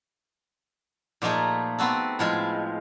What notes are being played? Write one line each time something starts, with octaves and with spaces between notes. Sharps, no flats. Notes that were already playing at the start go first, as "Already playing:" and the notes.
A#2 F3 A3 D#4 G#4
B3 C4 F#4 A4
A2 F3 G#3